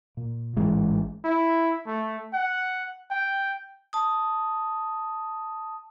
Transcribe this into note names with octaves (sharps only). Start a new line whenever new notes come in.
A#2
A1 G#2 E3 G#3
E4
A3
F#5
G5
A5 D#6